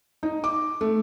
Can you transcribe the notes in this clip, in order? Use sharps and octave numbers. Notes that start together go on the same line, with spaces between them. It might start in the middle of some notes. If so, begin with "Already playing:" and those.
D#4
D6
A3